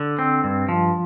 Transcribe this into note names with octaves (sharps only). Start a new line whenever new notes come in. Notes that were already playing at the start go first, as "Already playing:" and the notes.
Already playing: D3
C4
G2
F3